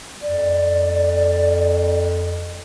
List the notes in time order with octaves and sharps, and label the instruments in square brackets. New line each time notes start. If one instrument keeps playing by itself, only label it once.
[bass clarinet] F2 [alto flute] D5